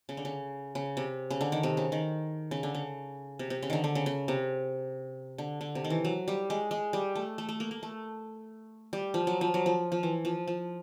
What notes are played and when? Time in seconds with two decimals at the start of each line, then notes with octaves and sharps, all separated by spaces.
0.09 C#3
0.17 D3
0.25 C#3
0.75 C#3
0.97 C3
1.30 C#3
1.41 D3
1.52 D#3
1.63 C3
1.77 C#3
1.92 D#3
2.51 C#3
2.63 D3
2.75 C#3
3.39 C3
3.50 C3
3.63 C#3
3.70 D3 D#3
3.84 D3
3.95 C#3
4.06 C#3
4.28 C3
5.38 D3
5.61 D3
5.75 C3
5.84 D#3
5.90 E3
6.05 F#3
6.28 G3
6.50 G#3
6.71 G#3
6.93 G3
7.16 A3
7.38 A3
7.49 A3
7.60 A#3
7.71 A#3
7.83 A3
8.93 G3
9.14 F3
9.27 F#3
9.41 F3
9.54 F#3
9.66 F3
9.92 F3
10.03 E3
10.25 F3
10.48 F3